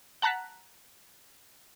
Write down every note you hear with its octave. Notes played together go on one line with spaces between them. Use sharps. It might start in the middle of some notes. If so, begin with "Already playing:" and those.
F#5 A5 A#5 F#6 B6